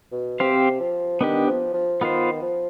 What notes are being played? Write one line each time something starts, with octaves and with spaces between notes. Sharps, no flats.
B2
C3 C4 G4 C5 F5
F3
D#3 B3 D4 G4
F3
F3
D#3 B3 F4 C5
F3